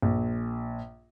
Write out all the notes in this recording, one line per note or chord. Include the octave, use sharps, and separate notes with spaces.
A#1